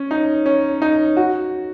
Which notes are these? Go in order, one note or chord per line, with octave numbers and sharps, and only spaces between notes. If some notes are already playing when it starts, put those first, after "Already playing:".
Already playing: C#4
D#4
C#4
D#4
F#4